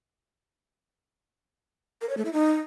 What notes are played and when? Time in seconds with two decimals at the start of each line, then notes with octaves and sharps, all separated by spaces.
2.01 A#4
2.09 C#5
2.17 A3
2.25 E4
2.33 D#4